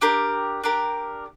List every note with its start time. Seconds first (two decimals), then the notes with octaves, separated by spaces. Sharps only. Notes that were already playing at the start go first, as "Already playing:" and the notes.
0.01 D4 G4 A#4
0.63 D4 G4 A#4